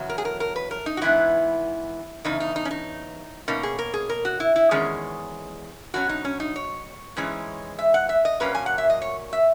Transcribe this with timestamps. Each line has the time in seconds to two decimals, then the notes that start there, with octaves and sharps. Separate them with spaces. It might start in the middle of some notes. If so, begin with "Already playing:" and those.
Already playing: E2 C#3 F#3
0.09 A#4
0.18 G#4
0.25 A#4
0.40 A#4
0.56 B4
0.71 A#4
0.86 D#4
0.97 F#4
1.02 G#2 E3 B3 E4
2.25 E2 C#3 D#4
2.40 D#4
2.56 D#4
2.65 C#4
2.71 D#4
3.48 B2 A#3 C#4 D#4
3.63 G#4
3.79 A#4
3.94 G#4
4.09 A#4
4.25 F#4
4.40 E4
4.56 E4
4.71 E2 D#3 G#3 C#4 G#4
5.94 B2 F#3 C#4 F#4
6.09 D#4
6.25 C#4
6.40 D#4
6.56 C#5
7.17 G#2 E3 G#3 C#4
7.79 E5
7.94 F#5
8.09 E5
8.25 D#5
8.40 A#2 F#3 A#3 C#4 B4
8.55 G#5
8.66 F#5
8.78 E5
8.90 D#5
9.02 C#5
9.33 E5